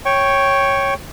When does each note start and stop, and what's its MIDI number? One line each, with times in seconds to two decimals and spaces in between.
0.05 0.94 73
0.05 0.94 79
0.05 0.94 85